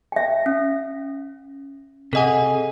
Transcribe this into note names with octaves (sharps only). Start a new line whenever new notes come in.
E5 G5
C#4
C3 G#4 A4 D#5 F#5